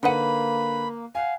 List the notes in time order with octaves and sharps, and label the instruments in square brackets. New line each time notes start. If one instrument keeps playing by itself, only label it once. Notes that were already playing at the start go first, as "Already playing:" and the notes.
[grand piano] D3 B4 D#7 [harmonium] A#3 [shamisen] D#4 C5 F#5 [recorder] B5
[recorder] F5 [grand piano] F#5 G#5